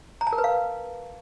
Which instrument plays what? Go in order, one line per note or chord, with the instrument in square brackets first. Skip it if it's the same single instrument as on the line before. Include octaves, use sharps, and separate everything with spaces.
[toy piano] A#5
A5
A#4
B4
F5